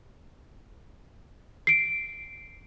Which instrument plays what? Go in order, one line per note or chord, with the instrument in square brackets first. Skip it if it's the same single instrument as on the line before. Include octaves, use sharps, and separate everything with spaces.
[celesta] C7 D7